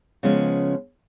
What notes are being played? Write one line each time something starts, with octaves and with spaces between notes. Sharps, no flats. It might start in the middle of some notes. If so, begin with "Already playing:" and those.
C#3 F3 G#3 B3 C#4